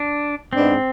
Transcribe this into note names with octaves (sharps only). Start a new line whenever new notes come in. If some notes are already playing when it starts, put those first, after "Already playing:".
Already playing: D4
G#2 G#3 B3 C4 D4